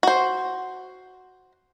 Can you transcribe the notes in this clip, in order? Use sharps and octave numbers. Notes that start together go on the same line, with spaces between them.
F#4 C5